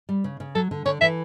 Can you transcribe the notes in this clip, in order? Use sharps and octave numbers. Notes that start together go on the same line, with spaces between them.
G3
C#3
C#3
F#3 A4
D3
D3 C#5
E3 E5